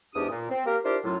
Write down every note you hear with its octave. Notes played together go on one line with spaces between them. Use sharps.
E2 G#2 D4 G4 D#6
A#2
C4
A#3 G4 A#4
D4 E4 F4 G4 A#4 C5
F#2 A2 F#3 F4